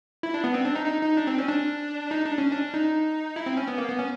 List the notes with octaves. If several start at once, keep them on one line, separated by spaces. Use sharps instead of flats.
E4
D4
B3
C4
D4
D#4
D#4
D#4
D4
C4
C#4
D4
D#4
D4
C#4
D4
D#4
E4
C4
C#4
B3
A#3
B3
C#4